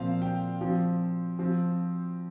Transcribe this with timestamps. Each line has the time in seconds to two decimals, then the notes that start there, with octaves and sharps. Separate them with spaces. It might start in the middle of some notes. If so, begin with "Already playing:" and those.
Already playing: A#2 F3 C4 F5
0.22 G5
0.61 F3 C4
1.39 F3 C4